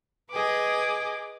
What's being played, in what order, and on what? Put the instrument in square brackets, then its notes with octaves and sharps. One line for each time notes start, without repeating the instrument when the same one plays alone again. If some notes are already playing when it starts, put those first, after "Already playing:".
[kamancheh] G#4 D6 [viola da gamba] B4 D#5